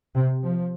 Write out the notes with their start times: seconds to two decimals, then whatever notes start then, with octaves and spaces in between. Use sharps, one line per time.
0.15 C3
0.43 F3